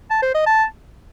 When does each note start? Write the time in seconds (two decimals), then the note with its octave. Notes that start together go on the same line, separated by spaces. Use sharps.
0.11 A5
0.23 C5
0.35 D#5
0.46 A5